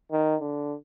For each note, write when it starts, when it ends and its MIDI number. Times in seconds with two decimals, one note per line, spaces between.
0.12 0.36 51
0.41 0.75 50